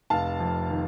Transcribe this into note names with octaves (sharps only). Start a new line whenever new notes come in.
F1 F5 A5
F2
D#3